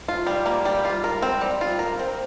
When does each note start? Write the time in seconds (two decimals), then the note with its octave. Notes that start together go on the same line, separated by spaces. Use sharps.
0.08 F4
0.27 G3
0.46 A#3
0.65 G3
0.85 F4
1.04 A#4
1.22 C4
1.41 G3
1.61 F4
1.79 A#4
1.99 C4